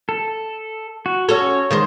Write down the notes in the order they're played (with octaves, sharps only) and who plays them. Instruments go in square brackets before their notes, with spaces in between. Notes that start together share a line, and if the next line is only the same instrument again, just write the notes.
[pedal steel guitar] A4
F#4
[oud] C#4 F#4 A4 [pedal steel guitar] C#5
[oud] D#3 G#3 C5